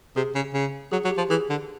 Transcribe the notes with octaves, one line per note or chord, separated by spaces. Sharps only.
C3 G#4
C#3
C#3
F#3 G#4
F#3
G4
F3
E3 G#4
D3